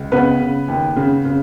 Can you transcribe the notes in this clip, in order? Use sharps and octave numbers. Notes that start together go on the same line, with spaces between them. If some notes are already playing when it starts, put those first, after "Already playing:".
Already playing: C#2
C#3 B3 B4
C#3
D#2
C#3
C#3